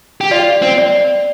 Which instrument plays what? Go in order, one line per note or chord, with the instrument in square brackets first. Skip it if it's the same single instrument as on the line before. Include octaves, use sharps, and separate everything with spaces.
[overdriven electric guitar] G4
[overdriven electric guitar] F4 [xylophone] D5
[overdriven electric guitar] C4
[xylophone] D5